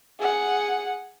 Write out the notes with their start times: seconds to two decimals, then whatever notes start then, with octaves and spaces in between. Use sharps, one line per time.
0.19 G#4 F#5